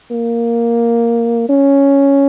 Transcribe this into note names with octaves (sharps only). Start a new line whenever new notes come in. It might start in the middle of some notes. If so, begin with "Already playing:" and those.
A#3
C#4